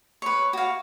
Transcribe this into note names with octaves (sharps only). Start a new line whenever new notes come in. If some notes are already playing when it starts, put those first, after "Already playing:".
B4 C#5
F#4 F5